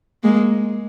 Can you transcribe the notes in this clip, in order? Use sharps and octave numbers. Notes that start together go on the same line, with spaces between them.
G#3 A#3